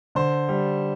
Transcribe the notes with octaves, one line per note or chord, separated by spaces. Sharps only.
D3 C5
G3